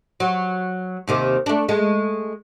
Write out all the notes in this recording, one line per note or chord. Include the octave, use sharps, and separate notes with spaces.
F#3
D#2 C3 D#3
A3 D4
G#3 A3